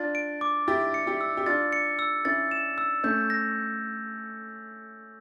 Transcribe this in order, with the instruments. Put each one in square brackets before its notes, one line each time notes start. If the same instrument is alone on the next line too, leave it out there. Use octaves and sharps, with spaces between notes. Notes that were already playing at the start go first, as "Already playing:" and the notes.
Already playing: [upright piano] D4 F4 [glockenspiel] A6
[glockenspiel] D7
D6
[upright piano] E4 G4 [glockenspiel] A6
[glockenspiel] C#7
[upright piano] E4 G4
[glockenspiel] E6
[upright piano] G4
[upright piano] D4 F4 [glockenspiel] A6
[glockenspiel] C#7
E6
[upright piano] C#4 E4 [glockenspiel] A6
[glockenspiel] E7
E6
[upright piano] A3 C#4 [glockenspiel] G6
[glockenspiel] A#6